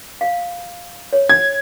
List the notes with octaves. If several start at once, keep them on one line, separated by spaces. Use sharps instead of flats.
F5
C#5
G#6